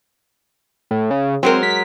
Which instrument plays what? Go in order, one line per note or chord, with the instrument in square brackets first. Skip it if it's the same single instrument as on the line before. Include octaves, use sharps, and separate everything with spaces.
[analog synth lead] A2
C#3
[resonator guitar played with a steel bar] F#3 G#3 A#4 [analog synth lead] C4
[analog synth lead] B6